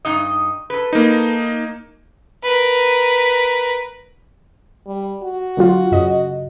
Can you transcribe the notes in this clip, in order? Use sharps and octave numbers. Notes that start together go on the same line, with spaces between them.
G2 D#4 D#5
A4 B4
A#3 D#4
A#4 B4
G3
F#4
D3 F#3 F4
F#2 C#3 D#5